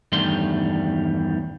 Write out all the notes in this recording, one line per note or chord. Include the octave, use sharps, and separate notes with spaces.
E2 G2 D#3 G3 A3 C6